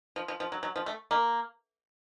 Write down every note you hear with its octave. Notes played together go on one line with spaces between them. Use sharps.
F3
F3
F3
F#3
F#3
F3
A3
A#3